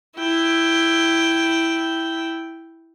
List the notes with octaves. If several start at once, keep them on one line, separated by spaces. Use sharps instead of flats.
E4 G5